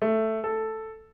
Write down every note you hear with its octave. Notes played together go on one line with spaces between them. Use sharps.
A3
A4